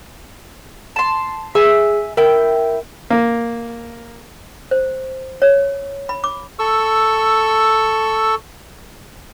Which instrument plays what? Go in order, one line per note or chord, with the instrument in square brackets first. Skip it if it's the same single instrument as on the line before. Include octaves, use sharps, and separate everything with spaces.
[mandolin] A5 C6
[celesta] G#4 [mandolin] E5 G#5 E6
[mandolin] E4 G5 [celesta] A#4
[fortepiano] A#3
[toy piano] C5
C#5
B5
D6
[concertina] A4 C#6 E6